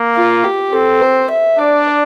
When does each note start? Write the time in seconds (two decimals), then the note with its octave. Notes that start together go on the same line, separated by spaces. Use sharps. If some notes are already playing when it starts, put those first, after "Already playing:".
Already playing: A#3
0.16 F4
0.44 G4
0.72 C4 A4
1.01 C5
1.30 E5
1.58 D4 D5